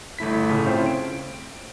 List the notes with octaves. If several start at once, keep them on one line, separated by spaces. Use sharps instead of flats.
G1 A3 E4 B6
A2 C#3 A3 C#4
C4 C#4 E4 F4 C5 G5
D7